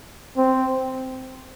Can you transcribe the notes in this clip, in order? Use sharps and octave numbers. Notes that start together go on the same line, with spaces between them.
C4